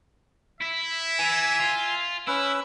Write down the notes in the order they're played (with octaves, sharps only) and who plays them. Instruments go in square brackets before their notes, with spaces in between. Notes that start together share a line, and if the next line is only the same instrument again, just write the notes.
[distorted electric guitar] E4 [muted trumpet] E5
[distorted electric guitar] E3 [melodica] G#5
[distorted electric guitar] F4
[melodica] C#4 B4 E6 [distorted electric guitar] E4